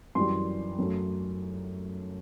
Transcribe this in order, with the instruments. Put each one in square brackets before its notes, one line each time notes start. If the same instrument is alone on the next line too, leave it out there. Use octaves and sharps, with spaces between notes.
[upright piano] F#2 E3 G3 C6
F#2 F#3 A3